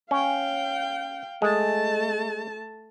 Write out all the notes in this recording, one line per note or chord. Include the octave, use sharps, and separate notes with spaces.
C#4 F5 G5
G#3 A3 A5